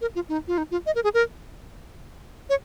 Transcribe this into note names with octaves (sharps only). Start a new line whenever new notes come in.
A#4
F4
D#4
F4
D#4
F4
D#5
A#4
G#4
A#4
C#5